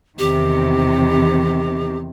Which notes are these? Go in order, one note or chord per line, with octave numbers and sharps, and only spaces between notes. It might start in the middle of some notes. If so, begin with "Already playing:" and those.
E2 C3 D#3 G4